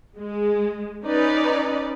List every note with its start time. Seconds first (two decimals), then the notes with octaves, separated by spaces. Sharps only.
0.19 G#3
1.06 C#4 D#4 B4 D5